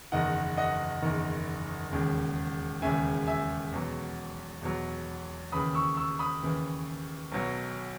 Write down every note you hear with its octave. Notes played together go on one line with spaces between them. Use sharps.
F#1 E2 D#3 D#5 F#5
D#5 F#5
F#1 E2 D#3
E1 D#2 C#3
E1 D#2 C#3 E5 G#5
E5 G#5
E2 B2 F#3
E2 B2 F#3
D#2 C#3 E3 B5 D#6
C#6 E6
C#6 E6
B5 D#6
D#2 C#3 E3
B1 B2 F#3